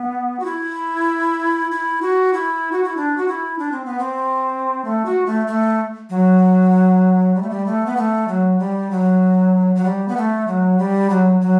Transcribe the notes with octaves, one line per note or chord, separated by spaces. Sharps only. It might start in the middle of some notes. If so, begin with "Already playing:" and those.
Already playing: B3
F#4
E4
E4
F#4
E4
F#4
E4
D4
F#4
E4
D4
C4
B3
C4
A3
F#4
A3
A3
F#3
G3
A3
G3
A3
B3
A3
F#3
G3
F#3
F#3
G3
B3
A3
F#3
G3
F#3
F#3